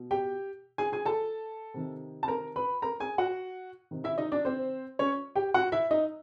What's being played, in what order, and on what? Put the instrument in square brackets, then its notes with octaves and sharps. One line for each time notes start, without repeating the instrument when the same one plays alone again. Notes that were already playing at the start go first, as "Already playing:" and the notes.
Already playing: [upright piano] B2
G4 G5
G#4 G#5
G#4 G#5
A4 A5
C3 D#3
A5
A#4 A#5
B4 B5
A#4 A#5
G#4 G#5
F#4 F#5
C3 D#3
E4 E5
D#4 D#5
D4 D5
C4 C5
C#4 C#5
G4 G5
F#4 F#5
E4 E5
D#4 D#5